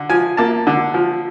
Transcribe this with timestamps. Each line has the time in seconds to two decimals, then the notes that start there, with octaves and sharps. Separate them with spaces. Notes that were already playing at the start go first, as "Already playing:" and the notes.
Already playing: D3
0.09 F3 G#5
0.37 A#3 A5
0.67 D3
0.94 F3